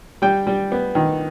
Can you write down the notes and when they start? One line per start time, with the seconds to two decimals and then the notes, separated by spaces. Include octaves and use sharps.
0.22 G3 G5
0.47 G3
0.72 B3
0.95 D#3